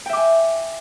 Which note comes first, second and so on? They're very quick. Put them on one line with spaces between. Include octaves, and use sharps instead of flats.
G5 E5 D6 G#5